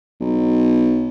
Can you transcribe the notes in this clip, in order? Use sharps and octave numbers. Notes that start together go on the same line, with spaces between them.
B1